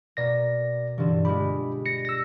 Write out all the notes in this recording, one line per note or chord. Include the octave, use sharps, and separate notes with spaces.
B2 A#3 D5 A#6
G2 D3 E3 E7
G#3 F4 G4 B5
A#6 C#7
E6 A#6